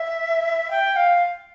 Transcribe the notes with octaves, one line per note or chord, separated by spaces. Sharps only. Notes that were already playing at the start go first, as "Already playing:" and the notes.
Already playing: E5
G5
F5